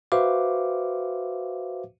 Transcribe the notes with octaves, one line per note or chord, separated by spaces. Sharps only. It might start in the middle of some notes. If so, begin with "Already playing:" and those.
F#4 B4 C5 E5 F5 D6